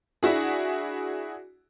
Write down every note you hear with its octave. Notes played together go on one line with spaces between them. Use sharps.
D4 E4 F#4 G#4